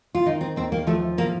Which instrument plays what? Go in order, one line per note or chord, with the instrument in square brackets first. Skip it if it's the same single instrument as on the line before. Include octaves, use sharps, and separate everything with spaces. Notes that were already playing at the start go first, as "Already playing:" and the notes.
[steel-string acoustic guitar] F4
D#3 D#4
C4
D#2 C4
A#3
F3 A3
A2 A#3